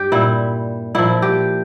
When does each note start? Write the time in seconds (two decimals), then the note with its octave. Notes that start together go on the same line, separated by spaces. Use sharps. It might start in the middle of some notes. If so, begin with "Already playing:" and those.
Already playing: G2 G4
0.12 A#2 G3 E4
0.95 A#2 F3 E4
1.22 G4